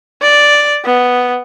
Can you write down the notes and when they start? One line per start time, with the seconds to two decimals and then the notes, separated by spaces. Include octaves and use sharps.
0.22 D5
0.85 B3